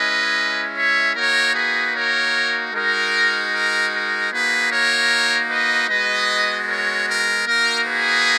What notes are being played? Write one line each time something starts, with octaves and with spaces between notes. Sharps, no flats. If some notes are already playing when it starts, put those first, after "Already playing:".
Already playing: G#3 C#4 E4 B4 D#5
C#5 E5
A#3 D#4 F#4 A#4 C#5
G#4 B4
A#4 C#5
G#3 D#4 F#4 A#4
A#4
A#4
A#3 D#4 F#4 G#4 B4
A#4 C#5
B4 D#5
G#3 B3 F#4 B4 D#5
A#4 C#5
A#4
A#3 D#4 F#4 A#4
G#4 B4